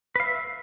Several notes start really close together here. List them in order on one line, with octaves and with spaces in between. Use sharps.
B4 F5 E5